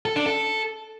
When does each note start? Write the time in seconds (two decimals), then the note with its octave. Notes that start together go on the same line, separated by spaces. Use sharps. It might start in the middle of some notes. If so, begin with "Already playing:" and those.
0.05 A4
0.16 D4
0.26 A4